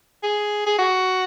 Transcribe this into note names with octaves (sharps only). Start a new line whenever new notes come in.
G#4
G#4
F#4